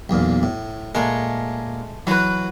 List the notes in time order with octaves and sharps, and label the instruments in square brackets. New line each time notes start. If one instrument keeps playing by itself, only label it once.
[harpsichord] B1 E2 A#2
A2
[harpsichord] A#2 A#4 [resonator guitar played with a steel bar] G#3 A3
[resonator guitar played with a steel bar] E3 B4 [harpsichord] F#3 F#4